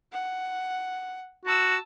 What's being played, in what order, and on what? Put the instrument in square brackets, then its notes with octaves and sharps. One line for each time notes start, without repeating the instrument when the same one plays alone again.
[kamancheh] F#5
[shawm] F#4 [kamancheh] A5 E6